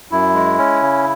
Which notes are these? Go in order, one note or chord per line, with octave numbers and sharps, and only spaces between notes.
F#2 E4
G#3
C#4
C#3